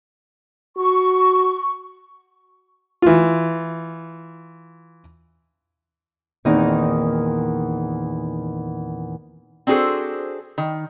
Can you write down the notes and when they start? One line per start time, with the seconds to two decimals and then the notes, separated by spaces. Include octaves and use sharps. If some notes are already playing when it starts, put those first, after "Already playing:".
0.77 F#4 C#6
3.02 E3 F4
6.45 E2 A#2 D#3 C4 D#4 D#5
9.67 C4 D4 F#4 G#4 A4 C5
10.58 D#3